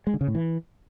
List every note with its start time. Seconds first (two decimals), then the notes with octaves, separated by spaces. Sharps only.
0.07 G#3
0.14 D3
0.21 C#3
0.28 A2
0.35 E3